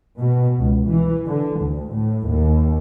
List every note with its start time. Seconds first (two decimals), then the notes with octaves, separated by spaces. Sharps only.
0.19 B2
0.60 C#2
0.89 E3
1.26 D3
1.60 D2
1.94 A2
2.28 D#2